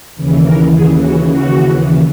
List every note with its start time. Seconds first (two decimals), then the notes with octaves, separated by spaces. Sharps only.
0.16 D#2 C#3 E3
0.44 A#4
0.73 G#4
1.01 F#4
1.31 F#4